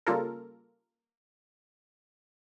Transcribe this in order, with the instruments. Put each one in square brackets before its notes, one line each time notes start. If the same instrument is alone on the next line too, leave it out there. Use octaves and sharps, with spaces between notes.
[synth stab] C#3 G3 A#3 F4 A4 A#4